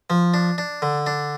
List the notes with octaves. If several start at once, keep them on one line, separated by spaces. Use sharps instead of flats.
F3
D4
D4
D3
D4